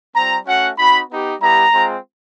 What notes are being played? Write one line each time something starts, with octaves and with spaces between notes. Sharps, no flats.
G3 C4 F4 A#5
A3 C#4 F#4 F#5
C4 D#4 F#4 B5
B3 D#4 G4
G3 B3 E4 G4 A#5
G#3 C4 F4